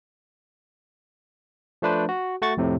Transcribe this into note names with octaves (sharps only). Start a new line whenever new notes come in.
F3 A3 D4 B4 C5
F#4
A3 F#4 C#6 A6
F2 A2 C3